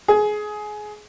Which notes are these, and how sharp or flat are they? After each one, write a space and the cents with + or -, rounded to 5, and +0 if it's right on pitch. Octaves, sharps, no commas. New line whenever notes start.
G#4 +20